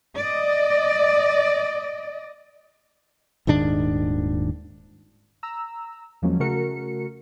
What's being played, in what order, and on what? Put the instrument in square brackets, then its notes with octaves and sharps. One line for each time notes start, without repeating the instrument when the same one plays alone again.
[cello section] D5 D#5
[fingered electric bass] D#1 G#2 D#3 D4
[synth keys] A#5 E6
E2 F3 F#3 G#3 A#3 C#4
C#3 A3 F#4 A#4 C#7